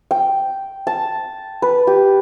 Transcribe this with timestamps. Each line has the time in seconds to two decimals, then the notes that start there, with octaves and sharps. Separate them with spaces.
0.11 G5
0.87 A5
1.62 B4
1.87 G4